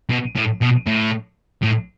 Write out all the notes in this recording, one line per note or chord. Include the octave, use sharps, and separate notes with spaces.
B2
A2
B2
A2
A2